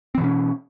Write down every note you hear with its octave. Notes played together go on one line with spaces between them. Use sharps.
B2 E3 C4 C#4